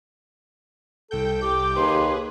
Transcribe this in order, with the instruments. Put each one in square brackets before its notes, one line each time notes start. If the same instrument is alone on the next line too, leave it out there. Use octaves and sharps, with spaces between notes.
[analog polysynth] C2 G5 G6 [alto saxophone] A4
[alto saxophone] G4 [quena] D6
[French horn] D#2 [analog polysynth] G#4 B4 [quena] C6